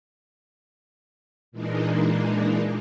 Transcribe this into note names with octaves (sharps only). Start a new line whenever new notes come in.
A#2 E3 G#3 A#3 D4 D#4